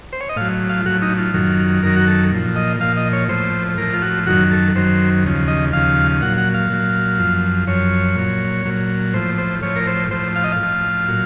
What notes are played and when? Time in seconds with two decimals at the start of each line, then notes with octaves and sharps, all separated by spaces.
0.13 C5
0.21 C#5
0.29 D#5
0.36 A2 F#3 F5
0.69 F5
0.80 F4
0.86 A2 F#3 F#4
1.02 D#4
1.18 F4
1.34 F#2 D#3 F#3
1.83 F#2 D#3 F#3 A#4
1.96 F#4
2.07 A4
2.32 A#2 F3
2.56 D#5
2.80 A#2 F3 F5
2.97 D#5
3.13 C#5
3.29 A2 F3 C5
3.78 A2 F3 A#4
3.93 F4
4.02 F#4
4.27 F#2 D#3 F#3 F#4
4.51 A4
4.75 F#2 D#3 F#3 C5
5.24 D#2 C#3 F3
5.48 D#5
5.73 D#2 C#3 F3 F5
6.21 A#2 F#3 F#5
6.37 F#5
6.54 F5
6.70 A#2 F#3
7.19 F#2 F3
7.68 F#2 F3 C#5
8.16 A#2 F#3
8.65 A#2 F#3
9.14 A2 F3 C5
9.38 C5
9.62 A2 F3 C#5
9.76 A#4
9.87 C5
10.11 A2 F3 C5
10.36 F5
10.44 D#5
10.52 F5
10.60 A2 F3
11.08 A#2 F#3